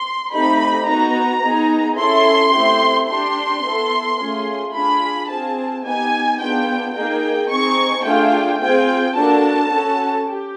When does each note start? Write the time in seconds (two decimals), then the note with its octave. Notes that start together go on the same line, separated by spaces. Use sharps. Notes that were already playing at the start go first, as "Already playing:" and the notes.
Already playing: C6
0.31 A3 C4 D#4 G4 B5
0.86 B3 D#4 F#4 A#5
1.43 B3 D#4 G#4
1.97 C#4 E4 A4 C6
2.53 A3 C4 E4 G4
3.08 D4 G4 C6
3.64 B3 E4 A4
4.18 A3 C#4 F4 G#4
4.74 D4 F4 G#4 B5
5.29 C4 F4 G#4 A5
5.85 B3 D#4 G4 G#5
6.40 B3 D4 F4 G#4 G5
6.95 A#3 D#4 G#4 G5
7.50 C4 D#4 G#4 C#6
8.05 A3 D4 F4 G#4 G5
8.61 C4 F4 G#4 G5
9.16 A#3 D4 F#4 A4 A5
9.71 C#4 F#4 A4
10.27 G4